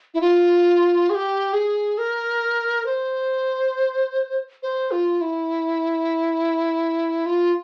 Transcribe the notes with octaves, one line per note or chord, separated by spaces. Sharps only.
E4
F4
G#4
G4
G#4
A#4
C5
C5
F4
E4
F4